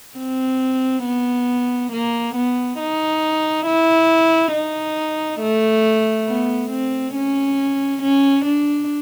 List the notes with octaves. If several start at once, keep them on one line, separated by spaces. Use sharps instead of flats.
C4
B3
A#3
B3
D#4
E4
D#4
A3
B3
C4
C#4
C#4
D4